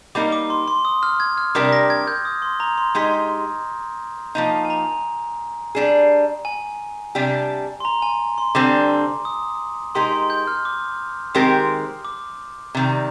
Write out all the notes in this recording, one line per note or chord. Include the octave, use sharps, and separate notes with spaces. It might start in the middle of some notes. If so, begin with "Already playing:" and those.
G3 A#3 D#4 A#4 D6
D6
C6
C6
D#6
F6
G#6
F6
C3 G3 D4 G4 A#4 D6
A#6
G#6
G6
D#6
C6
A#5
C6
G#3 D#4 G4
F3 A#3 D#4 A#5
G#5
A#5
G3 D4 G#4
G#5
C3 G3 D4 G4
C6
A#5
G#5
C6
D3 G3 C4 D6
D#6
G#3 D#4 G4 A#4 C6
C6
G6
F6
D6
D#3 G#3 C4 G4 A#4
D6
C3 D#3 G3